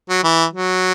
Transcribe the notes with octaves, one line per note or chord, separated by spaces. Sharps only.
F#3
E3
F#3